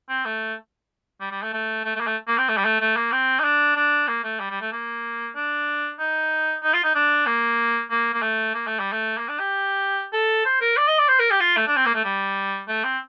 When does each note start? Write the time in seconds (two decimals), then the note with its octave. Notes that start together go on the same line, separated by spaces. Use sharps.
0.09 C4
0.25 A3
1.21 G3
1.31 G3
1.42 A3
1.53 A3
1.85 A3
1.96 A3
2.00 A#3
2.07 A3
2.28 A#3
2.38 C4
2.49 A3
2.57 G3
2.65 A3
2.80 A3
2.96 A#3
3.12 C4
3.39 D#4
3.44 D4
3.76 D4
4.08 A#3
4.24 A3
4.40 G3
4.50 G3
4.61 A3
4.72 A#3
5.35 D4
5.99 D#4
6.63 D#4
6.73 F4
6.84 D#4
6.95 D4
7.26 A#3
7.90 A#3
8.14 A#3
8.22 A3
8.54 A#3
8.67 A3
8.79 G3
8.92 A3
9.18 A#3
9.29 D4
9.39 G4
10.13 A4
10.46 C5
10.61 A#4
10.77 D5
10.88 D#5
10.98 D5
11.09 C5
11.19 A#4
11.31 G4
11.40 F4
11.57 A3
11.67 D4
11.76 C4
11.86 A#3
11.95 A3
12.04 G3
12.68 A3
12.84 C4